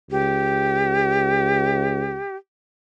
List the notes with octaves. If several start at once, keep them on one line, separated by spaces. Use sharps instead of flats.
C#2 G4